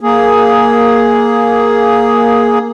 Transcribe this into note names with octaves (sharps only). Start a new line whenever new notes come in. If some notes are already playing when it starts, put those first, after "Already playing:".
A#3 G#4